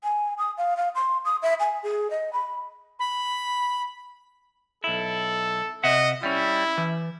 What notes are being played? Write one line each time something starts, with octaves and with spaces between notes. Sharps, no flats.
G#5
D#6
F5
F5
C6
D#6
E5
G#5
G#4
D#5
B5
B5
B1 E4 A4
C3 D#5 E5 F#5
G3 C#4 E4
E3